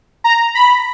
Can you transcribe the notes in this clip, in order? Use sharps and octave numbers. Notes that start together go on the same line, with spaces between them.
A#5
B5